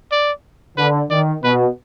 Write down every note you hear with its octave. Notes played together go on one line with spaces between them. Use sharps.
D5
D3 B4
D#3 D5
B2 B4